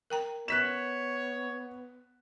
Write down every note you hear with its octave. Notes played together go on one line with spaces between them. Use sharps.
A#4 G5 A#5
B3 C#5 F#6 B6 E7